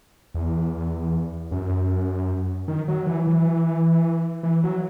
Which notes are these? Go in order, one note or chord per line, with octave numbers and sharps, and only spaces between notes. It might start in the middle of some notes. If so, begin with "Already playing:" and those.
E2
F#2
D#3
F#3
E3
E3
E3
F#3